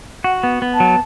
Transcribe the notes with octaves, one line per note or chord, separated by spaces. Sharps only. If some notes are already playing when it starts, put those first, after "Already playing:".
F#4 F#5
B3
B3
A5
F#3